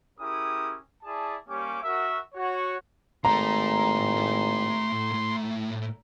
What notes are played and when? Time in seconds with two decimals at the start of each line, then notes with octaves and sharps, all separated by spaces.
0.18 C#4 E4 G4 G#4 A#4 D#6
1.03 E4 G#4 D5 A5
1.47 G3 A#3 C#4 G4 C#5 D6
1.83 F#4 A#4 E5
2.34 F#4 C#5
3.25 G#1 A2 A3 A#5 C6